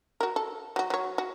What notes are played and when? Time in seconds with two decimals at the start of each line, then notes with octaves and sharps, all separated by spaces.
0.21 F#4 A#4
0.36 A4
0.76 F#3 F#4
0.90 F#3 C#5
1.18 F#4